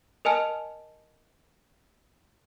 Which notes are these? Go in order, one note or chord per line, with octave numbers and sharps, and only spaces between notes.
A#4 D#5 G#5 A5 F6